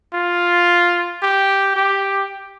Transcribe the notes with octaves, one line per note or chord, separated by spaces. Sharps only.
F4
G4
G4